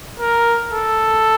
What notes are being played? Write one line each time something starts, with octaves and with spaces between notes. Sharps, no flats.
A#4
A4